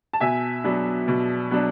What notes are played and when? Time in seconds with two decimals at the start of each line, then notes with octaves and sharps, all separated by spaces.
0.13 A5
0.20 B2 E5 G#5
0.64 F#3 B3 D4
1.08 B2
1.51 F#3 B3 D4